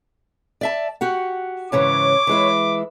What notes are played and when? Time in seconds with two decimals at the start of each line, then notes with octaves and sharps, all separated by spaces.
0.61 D5 E5 A5
1.01 F#4 G4 F#5
1.72 G#2 C#3 E3 C#5 D6
2.27 E3 G#3 E4